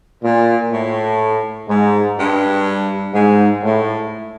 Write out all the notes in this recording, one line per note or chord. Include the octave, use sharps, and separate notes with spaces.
A#2
A2
G#2
G2
G#2
A2